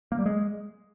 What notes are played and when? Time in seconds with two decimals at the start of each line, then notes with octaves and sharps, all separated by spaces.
0.12 A#3
0.19 G3
0.26 G#3